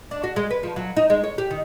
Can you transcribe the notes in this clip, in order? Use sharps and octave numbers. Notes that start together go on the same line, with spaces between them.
D4
F#4
G#3
B4
F3
F#3
D#4
G#3
C#5
G4
D#3